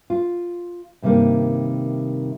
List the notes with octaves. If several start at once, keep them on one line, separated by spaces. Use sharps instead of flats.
F4
G2 C3 D#3 A3 A#3